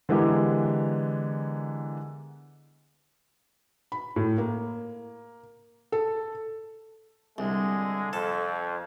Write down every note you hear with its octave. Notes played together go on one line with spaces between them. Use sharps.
D3 E3 G#3 B3 G4 A#4
B5
A2
A#3
A4
C2 D3 G#3
F2 A4